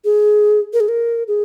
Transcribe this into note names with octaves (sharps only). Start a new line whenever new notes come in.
G#4
A#4
G#4
A#4
G#4